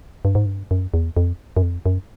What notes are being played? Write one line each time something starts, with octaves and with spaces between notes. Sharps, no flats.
G2
G#2
G2
F#2
E2
F2
F#2
F2
F#2